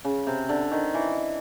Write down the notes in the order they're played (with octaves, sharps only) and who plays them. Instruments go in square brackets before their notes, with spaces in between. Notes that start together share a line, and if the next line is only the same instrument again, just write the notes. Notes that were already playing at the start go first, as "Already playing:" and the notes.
[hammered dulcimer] C#3
C3
D3
D#3
E3